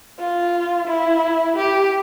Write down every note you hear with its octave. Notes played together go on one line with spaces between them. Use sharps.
F4
E4
G4